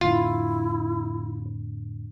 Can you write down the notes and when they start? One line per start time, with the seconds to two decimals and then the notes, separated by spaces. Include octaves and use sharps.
0.01 F2 A2 D3 E4 F4